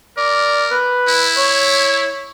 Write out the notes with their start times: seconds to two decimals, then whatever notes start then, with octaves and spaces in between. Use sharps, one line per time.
0.17 A#4 D5
0.71 B4
1.08 E4
1.37 C#5